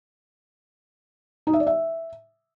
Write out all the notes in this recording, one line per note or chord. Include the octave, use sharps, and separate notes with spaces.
D#4
E5
D5
E5